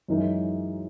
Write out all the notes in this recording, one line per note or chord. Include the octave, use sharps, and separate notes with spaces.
F#2 E3 G#3 D#4 A#4